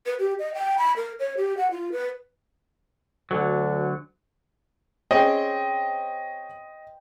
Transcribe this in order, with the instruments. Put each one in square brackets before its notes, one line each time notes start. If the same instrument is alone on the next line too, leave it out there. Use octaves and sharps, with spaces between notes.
[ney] B4
G4
D#5
G5
B5
A#4
C#5
G4
F#5
F4
B4
[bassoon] D2 [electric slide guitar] D3 F#3
[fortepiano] C4 C#4 G#4 [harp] C5 G5 [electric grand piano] D#5